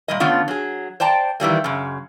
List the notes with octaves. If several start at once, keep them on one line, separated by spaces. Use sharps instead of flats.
A#2 G3 D#5
D3 A3 B3 C#4 F4
F#3 G#4
C5 D5 G5 A5 A#5
D#3 E3 G3 A#3
F#2 C#3